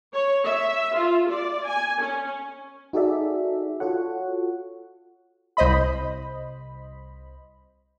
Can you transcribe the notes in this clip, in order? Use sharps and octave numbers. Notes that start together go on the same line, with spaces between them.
C#5
E5
F4
D5
G#5
C#4
D#4 F#4 G#4 A4 D5 E5
F4 F#4 A4 C#5 F#5
C2 C5 D#5 B5